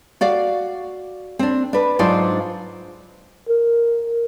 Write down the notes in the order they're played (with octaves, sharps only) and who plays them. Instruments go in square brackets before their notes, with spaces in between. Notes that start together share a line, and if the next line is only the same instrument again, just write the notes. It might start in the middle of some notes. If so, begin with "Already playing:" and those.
[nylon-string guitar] F#4 D5 F5
C4 D4
D4 B4
G#2 F#3 D4 F4 C5 D5
[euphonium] A#4